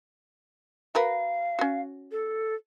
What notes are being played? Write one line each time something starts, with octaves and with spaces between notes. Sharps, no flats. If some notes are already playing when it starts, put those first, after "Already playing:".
F#4 A#4 B4 F5
C#4 F#4
A4